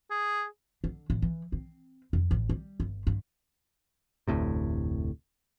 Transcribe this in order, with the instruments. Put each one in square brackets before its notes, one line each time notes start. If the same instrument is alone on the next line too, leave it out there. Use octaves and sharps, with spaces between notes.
[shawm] G#4
[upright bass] D3
A1
E3
C4
F2
A1
G3
G1
G2
[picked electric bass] F1 D2 A2 C3